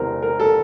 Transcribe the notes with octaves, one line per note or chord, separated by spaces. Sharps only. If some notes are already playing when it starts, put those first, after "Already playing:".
Already playing: E1 E2 C3 E3 A#4 C5
A#4
A4